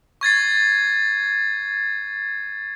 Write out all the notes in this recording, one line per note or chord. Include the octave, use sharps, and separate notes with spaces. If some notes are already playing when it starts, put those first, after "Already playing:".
C#6 G#6 A6 C7